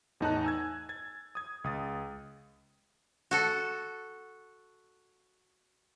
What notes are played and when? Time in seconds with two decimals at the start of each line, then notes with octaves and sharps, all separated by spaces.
0.20 E2 A2 D#4 A5 A#5 F#6
0.44 G#5 E6 G#6
0.89 G#6 A6
1.35 D#6 G#6
1.64 C#2 D#6 A6
3.31 F#4 A4